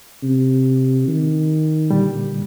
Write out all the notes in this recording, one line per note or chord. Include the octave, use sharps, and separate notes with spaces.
C3
D#3
A#2 D3 G3